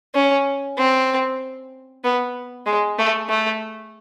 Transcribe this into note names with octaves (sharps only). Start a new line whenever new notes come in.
C#4
C4
B3
G#3
A3
A3